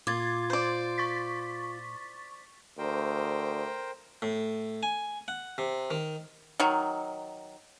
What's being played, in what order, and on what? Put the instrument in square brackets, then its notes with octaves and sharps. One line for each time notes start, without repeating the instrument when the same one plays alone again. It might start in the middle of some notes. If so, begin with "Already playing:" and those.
[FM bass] A#2 [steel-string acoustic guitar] F4 [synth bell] D6 G#6 A6
[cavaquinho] C5 D5
[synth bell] C#6 A6 B6
[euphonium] D2 [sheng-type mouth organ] A#4 C5 G5
[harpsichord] A2
G#5
F#5
C3
D#3
[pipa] D#3 F#3